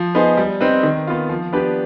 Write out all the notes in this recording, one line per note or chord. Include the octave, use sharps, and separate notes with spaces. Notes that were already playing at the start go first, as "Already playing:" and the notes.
Already playing: F3
B3 D#4 G#4 C5
G3
C4 D#4 B4
D#3
B3 F4
F3
B3 D4 G4 B4